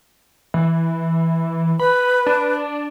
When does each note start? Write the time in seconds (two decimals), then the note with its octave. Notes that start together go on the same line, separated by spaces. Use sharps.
0.54 E3
1.80 B4 B5
2.26 D4